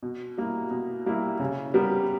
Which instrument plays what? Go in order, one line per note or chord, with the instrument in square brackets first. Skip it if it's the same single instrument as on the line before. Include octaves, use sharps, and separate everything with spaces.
[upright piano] B2
G3 A#3 E4
B2
G3 A#3 E4
C#3
G3 B3 G4 A#4